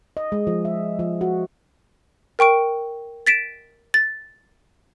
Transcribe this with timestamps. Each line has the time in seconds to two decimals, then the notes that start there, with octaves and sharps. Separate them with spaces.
0.17 D#5
0.32 G#3
0.47 F3
0.65 E5
0.99 F3
1.21 F#4
2.39 A#4 G5 C#6 D7
3.27 A6 B6 D7 E7
3.94 A6